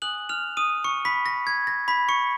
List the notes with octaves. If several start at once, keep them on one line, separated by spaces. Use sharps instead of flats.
G#5 D#6 F#6 F#7
F6 F7
D#6 D#7
C#6 C#7
B5 B6
A#6
G#6
A#6
B5 B6
C#6 C#7